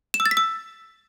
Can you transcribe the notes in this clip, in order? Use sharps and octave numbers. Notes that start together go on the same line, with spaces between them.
E7
E6
A6
B6
E6